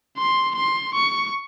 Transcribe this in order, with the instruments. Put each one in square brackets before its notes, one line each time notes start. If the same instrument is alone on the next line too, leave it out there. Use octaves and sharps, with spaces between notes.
[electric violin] C6
C6
C#6